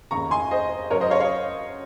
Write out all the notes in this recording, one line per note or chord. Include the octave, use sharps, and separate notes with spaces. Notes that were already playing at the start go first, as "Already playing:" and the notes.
F1 D#2 C#3 A#5 C#6
G#5 C6
C5 D#5
F#2 C#3 F#3 A#4 C#5
C5 D#5
C#5 F5
C#5 F5